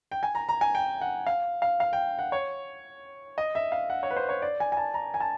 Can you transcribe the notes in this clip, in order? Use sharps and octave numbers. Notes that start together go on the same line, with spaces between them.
G5
G#5
A#5
A#5
G#5
G5
F#5
F5
F5
F5
G5
F#5
C#5
D#5
E5
F5
F#5
C#5
B4
C5
C#5
D5
G#5
G#5
A5
A#5
G#5
A5